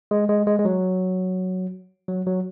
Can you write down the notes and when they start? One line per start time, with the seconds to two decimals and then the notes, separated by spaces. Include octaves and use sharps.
0.11 G#3
0.29 G#3
0.47 G#3
0.59 G#3
0.65 F#3
2.08 F#3
2.26 F#3